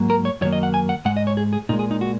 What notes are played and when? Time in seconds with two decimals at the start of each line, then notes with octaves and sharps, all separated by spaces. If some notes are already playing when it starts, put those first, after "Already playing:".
Already playing: G#2 F#3 A#3
0.10 A#4
0.25 C#5
0.41 F#2 D#3 F#3 A#3 C#5
0.52 D#5
0.63 F#5
0.74 G#5
0.89 F#5
1.05 G#2 G#3 F#5
1.17 D#5
1.27 C#5
1.37 G#4
1.53 G#4
1.69 A#2 D#4
1.73 G#3
1.79 G#4
1.91 D#4
2.01 F#4